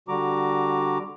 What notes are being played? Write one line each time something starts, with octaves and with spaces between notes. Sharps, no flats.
D3 G3 F#4 A#5 D6